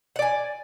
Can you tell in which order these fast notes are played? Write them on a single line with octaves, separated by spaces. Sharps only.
F#5 D5 G#5